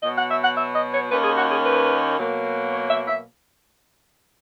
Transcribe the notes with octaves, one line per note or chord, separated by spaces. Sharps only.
B2 F#3 B3 D#5
F#5
E5
F#5
E5
D#5
C#5
D#2 D#3 A#3 C#4 B4
G#4
F#4
G#4
B4
B2 F#3 A#3
C#5
E5
E5